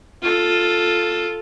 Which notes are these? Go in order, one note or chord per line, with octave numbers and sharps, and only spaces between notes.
F4 A4